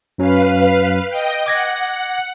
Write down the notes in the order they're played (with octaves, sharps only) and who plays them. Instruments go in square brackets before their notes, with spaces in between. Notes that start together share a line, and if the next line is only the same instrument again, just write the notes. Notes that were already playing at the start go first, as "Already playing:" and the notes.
[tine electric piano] F#2 F#3 C#4 [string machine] B4 F5
[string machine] D#5 G5
[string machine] F#5 [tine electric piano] D6 G#6 A#6